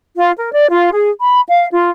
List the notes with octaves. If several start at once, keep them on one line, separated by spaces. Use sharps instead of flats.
F4
A#4
D5
F4
G#4
B5
F5
F4